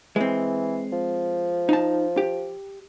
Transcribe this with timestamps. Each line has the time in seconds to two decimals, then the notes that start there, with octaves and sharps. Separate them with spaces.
0.16 E3 G#3 C4
0.92 F3
1.69 D#4 A5
2.17 G4